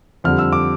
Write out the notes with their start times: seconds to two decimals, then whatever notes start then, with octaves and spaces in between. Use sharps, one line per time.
0.24 F2 D3 G3 F6
0.39 E6
0.52 D6